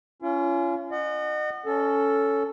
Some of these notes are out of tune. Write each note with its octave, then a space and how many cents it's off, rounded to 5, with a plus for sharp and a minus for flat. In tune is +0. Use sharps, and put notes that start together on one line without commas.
C#4 +15 F4 -35
D#5 -40 F#5 +10
C#4 +10 A4 +0